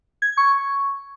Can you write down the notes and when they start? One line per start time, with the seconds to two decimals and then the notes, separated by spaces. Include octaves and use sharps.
0.22 G#6
0.37 C#6